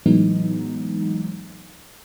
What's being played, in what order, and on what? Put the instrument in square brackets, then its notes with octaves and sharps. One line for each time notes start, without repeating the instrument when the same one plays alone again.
[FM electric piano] A2 E3 F#3 G#3 B3 D#4